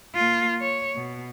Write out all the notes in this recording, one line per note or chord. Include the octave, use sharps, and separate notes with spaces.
A#3 F4
C#5
B2